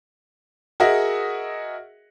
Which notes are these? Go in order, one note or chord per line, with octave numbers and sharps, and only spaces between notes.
F#4 G#4 A#4 D#5 E5 F#5